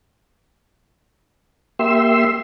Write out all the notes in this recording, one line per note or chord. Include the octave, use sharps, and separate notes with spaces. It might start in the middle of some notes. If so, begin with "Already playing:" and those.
A#3 G4 E5 C6 E6